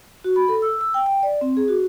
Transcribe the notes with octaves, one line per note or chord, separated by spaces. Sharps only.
F#4
B5
A4
E6
E6
G5
G5
D5
C4
G#4
F#4